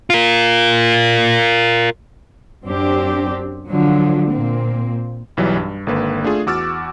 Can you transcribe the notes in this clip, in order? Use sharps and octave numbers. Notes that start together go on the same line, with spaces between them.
F4 A#4
F#2 C4 D4 G4
D3 F3 F#3
A#2 A#3 C4
B1 E3 F#3 G3
G2
G#1 D3 A#3 B4
A3 D4 F4 G#4
E2 F#4 D6 E6 F6 A6